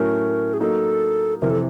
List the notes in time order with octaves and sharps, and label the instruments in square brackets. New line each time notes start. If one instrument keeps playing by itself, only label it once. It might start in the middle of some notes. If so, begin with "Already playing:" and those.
Already playing: [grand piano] A2 F#3 A3 C#4 [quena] A#4
[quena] G#4
[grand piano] F#3 A#3 D#4 [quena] A4
[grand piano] F2 C3 E3 [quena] A#4
[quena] A4